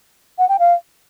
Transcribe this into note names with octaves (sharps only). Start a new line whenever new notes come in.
F#5
G5
F5